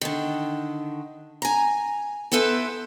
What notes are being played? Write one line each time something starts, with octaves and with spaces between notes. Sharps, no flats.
D3 D#3
G#5 A#5
B3 E4 A4 B4 C5